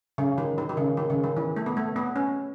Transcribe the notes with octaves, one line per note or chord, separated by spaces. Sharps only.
C#3
D#3
D#3
D#3
C#3
D#3
C#3
D#3
E3
A3
B3
A3
B3
C#4